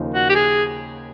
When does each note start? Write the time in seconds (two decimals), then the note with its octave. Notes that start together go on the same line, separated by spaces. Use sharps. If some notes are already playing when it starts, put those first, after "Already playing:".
Already playing: D#2 C#3 F3 A#3 D#4
0.14 F#4
0.30 G4
0.35 G#4